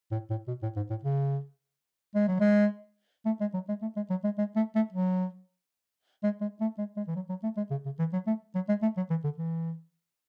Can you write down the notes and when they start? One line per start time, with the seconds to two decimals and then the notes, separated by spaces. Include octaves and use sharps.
0.12 A2
0.30 A2
0.48 B2
0.63 A2
0.76 G#2
0.90 A2
1.04 C#3
2.15 G#3
2.28 F#3
2.40 G#3
3.26 A3
3.41 G#3
3.54 F#3
3.69 G#3
3.82 A3
3.96 G#3
4.10 F#3
4.24 G#3
4.38 G#3
4.56 A3
4.75 A3
4.93 F#3
6.24 G#3
6.41 G#3
6.61 A3
6.78 G#3
6.97 G#3
7.07 E3
7.16 F#3
7.29 F#3
7.43 A3
7.57 G#3
7.71 C#3
7.85 C#3
7.99 E3
8.13 F#3
8.27 A3
8.55 F#3
8.69 G#3
8.82 A3
8.97 F#3
9.10 E3
9.24 D3
9.38 E3